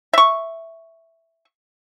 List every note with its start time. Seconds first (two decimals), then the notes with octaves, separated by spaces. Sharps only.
0.14 E5 C#6